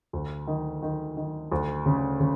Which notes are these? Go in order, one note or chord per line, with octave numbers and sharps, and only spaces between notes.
D2
D#3
D#3
D#3
D2
C#3
C#3